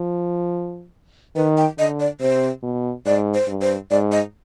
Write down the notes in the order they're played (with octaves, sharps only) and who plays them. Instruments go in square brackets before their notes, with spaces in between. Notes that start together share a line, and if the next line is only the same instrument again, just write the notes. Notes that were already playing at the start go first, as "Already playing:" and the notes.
Already playing: [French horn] F3
[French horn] D#3 [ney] B4
[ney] G5
[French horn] D3 [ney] D#5
[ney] D5
[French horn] C3 [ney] C5
[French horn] B2
[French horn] G#2 [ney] D5
[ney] C5
[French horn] G2
[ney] C5
[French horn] G#2 [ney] D5
[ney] D#5